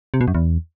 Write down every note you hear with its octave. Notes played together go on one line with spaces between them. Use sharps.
C3
B2
F#2
E2